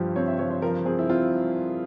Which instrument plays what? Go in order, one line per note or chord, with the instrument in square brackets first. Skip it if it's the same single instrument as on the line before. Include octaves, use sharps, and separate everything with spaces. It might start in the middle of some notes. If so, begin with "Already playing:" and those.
Already playing: [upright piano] G2 F3 [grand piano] G4
[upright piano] C4 [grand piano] C#5
[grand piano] E5
[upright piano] F3 [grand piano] C#5
[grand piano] C5
[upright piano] F3 [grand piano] A#4
[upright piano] C4 [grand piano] G#4
[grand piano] E4
[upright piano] C4 [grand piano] F4